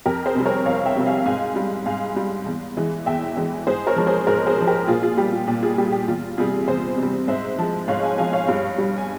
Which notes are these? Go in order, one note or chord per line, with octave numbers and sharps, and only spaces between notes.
F2 G4 A#4
G#4 C5
C3 G3
A#4 C#5
F2 C#5 F5
E5 G5
C3 G3
F5 G#5
G#2 F5 G#5
G3
G#2 F5 G#5
G3
E2
E3 G#3
E2 E5 G5
E3 G#3
G#2 G#4 C5
A#4 C#5
F3 G#3
G#4 C5
G#2 A#4 C#5
G#4 C5
F3 G#3
G4 A#4
A#2 F4 G#4
F4 G#4
G3 G4
F4
A#2 G4
F4 G#4
G3 G4
G#4
G4
E2 F4
C3 G3 F4 G#4
E2 G#4 C5
C3
G3
G#2 C5 E5
F3 G#3
G#2 C#5 F5
F5 G#5
F3 G#3 F5 G#5
C#5 F5
G2
G3
G#5